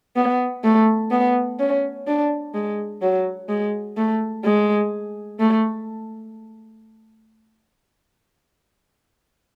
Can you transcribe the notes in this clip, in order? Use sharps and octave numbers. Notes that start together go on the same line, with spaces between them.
B3
A3
B3
C#4
D4
G#3
F#3
G#3
A3
G#3
A3